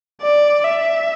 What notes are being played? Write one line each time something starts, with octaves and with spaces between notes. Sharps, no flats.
D5
E5